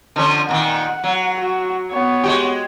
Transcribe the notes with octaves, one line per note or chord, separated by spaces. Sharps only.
D3 F3 C#4
A#2 D3 D#3 F#5
F#3
F#4
B3 C#5
G#3 F#4 G4